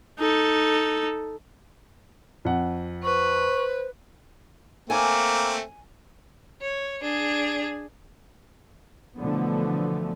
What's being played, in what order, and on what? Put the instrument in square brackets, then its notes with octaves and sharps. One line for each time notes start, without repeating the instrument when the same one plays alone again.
[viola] D#4 A4
[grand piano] F2 F#5
[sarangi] B4 [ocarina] C5 [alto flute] C#6
[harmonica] A3 C4 [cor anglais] A#3 [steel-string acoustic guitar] G#5
[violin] C#5
D4 G#4
[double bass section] B2 D3 E3 F3 A3 B3